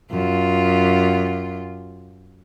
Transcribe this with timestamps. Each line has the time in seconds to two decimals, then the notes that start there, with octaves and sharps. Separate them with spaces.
0.11 F#2 F4